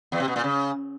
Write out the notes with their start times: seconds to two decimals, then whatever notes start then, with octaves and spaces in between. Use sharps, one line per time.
0.12 E2
0.20 C3
0.28 B2
0.36 A#2
0.44 C#3